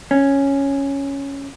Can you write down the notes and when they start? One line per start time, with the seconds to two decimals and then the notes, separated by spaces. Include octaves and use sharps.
0.11 C#4